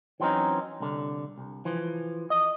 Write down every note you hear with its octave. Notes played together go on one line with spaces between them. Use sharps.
E3 F#3 C4 C#4 D#4
C2 D3
C2
E3 F3
D#5